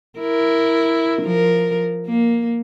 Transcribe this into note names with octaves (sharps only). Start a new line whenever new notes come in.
E4 A#4
F3 A#4
A#3